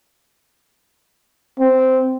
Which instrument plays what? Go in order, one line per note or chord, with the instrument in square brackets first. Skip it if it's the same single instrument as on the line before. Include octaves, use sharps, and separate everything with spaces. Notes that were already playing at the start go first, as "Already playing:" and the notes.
[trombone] C4